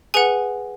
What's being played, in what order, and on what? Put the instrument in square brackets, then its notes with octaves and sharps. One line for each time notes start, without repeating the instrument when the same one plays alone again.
[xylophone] G#4 B4 F#5 G#5